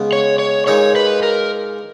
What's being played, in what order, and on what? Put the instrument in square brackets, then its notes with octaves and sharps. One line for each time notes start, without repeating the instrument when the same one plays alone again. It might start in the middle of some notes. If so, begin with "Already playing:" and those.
Already playing: [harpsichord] C#3 G#3 B3
[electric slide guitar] C#5
C#5
[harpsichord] A#2 G#3 D#4 [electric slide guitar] C#5
[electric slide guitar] B4
A#4